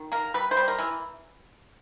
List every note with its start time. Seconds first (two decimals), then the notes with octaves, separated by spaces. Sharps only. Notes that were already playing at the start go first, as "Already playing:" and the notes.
Already playing: D#3
0.12 A#3 A#4
0.34 G3 B4
0.51 C5
0.57 G3
0.68 A#4
0.79 E3